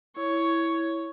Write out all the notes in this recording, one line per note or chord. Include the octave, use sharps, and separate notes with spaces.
E4 C#5